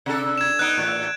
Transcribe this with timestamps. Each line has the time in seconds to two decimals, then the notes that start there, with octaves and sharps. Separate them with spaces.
0.06 C3 D4 A4
0.38 G#6 E7
0.59 B3 D#4 F#6 D7
0.77 E2 A2